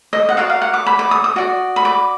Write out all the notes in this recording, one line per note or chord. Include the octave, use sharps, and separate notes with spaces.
D#5
F#5
F#4 A#4 D5 F5
F5
F#5
D6
B5
D6
D#6
D#6
F#4 D5
B5
D6